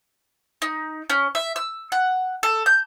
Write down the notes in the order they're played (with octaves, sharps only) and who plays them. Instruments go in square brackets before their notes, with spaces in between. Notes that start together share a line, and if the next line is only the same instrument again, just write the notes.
[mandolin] D#4
C#4
E5
E6
F#5
A4
G6